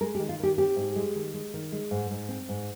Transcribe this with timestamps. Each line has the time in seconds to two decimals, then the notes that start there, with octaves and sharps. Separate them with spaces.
0.01 G#3 A#4
0.15 G4
0.19 D#3
0.29 F4
0.39 D#3 G4
0.58 C4 G4
0.76 G#2
0.96 G#3
1.16 D#3
1.33 G#3
1.54 D#3
1.72 G#3
1.91 G#2
2.11 G#2
2.29 C4
2.49 G#2